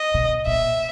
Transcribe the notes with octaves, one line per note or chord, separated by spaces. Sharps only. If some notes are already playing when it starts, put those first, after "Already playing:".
Already playing: D#5
B2
A#2 E5